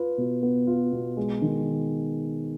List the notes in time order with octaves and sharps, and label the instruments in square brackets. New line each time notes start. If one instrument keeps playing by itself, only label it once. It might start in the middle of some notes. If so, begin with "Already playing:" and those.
Already playing: [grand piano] F4 B4
B2
B3
F4
B2
G#3
D#3